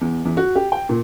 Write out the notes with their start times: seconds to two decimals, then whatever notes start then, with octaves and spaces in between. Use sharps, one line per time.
0.01 E2
0.25 E2
0.37 F#4
0.55 G4
0.72 G5
0.89 A#2